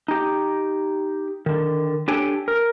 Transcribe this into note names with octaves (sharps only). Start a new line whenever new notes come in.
D#4 G4
D3 D#3
D4 G4 A4 C#5 G5 G#5
A#4